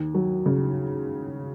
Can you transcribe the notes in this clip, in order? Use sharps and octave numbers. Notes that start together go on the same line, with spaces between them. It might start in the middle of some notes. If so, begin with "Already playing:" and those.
Already playing: D#2
F#3
C#3